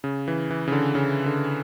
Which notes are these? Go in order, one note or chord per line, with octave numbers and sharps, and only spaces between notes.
C#3
E3
E3
C#3
D3
C#3
D3